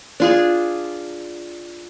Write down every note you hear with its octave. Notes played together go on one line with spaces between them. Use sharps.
D4 F4 G#4